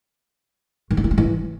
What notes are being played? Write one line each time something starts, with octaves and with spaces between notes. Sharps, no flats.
D#3
D4
E4
G3
E3